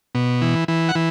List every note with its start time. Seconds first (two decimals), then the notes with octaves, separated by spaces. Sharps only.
0.15 B2
0.42 E3
0.68 E3
0.89 F#5
0.95 E3